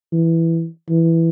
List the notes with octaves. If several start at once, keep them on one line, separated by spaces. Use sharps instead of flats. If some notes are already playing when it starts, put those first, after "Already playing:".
E3
E3